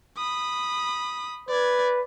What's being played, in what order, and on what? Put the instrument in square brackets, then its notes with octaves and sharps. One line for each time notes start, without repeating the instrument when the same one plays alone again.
[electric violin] B5 D#6
[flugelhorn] B4 [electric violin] D5 G#6